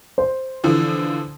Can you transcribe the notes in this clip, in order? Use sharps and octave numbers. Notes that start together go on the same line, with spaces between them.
C5
D3 E3 F3